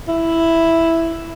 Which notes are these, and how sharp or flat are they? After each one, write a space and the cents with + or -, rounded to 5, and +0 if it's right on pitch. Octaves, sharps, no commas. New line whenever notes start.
E4 +0